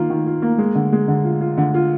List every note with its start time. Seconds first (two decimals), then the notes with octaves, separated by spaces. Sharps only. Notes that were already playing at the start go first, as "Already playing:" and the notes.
Already playing: D#3 A#3 F4
0.10 D#3
0.26 F4
0.42 A#3
0.58 G#3
0.75 D3
0.92 G#3
1.08 D3
1.24 F4
1.41 F4
1.57 D3
1.74 F4